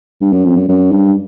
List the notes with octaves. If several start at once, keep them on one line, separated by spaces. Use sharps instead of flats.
G2
F#2
F2
F#2
F#2
G2